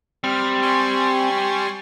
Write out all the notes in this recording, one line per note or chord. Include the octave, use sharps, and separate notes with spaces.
G3 C4 G4 F6
G#5 C6 C#6